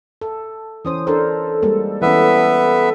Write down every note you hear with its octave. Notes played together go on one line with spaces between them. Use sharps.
A4
E3 C#4 C5 D#6
D4 A4 A#4 C5
G3 G#3 A#3
E3 B3 C#4 B4 E5